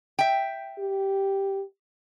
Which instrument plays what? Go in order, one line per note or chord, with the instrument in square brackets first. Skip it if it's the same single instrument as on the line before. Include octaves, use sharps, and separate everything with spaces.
[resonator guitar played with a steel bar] E5 G5
[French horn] G4